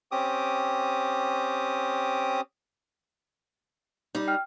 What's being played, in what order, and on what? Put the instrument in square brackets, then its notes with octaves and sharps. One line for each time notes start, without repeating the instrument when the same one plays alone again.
[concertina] C4 C#4 G4 D6 D#6
[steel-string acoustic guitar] G3 D#4
[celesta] G5 F6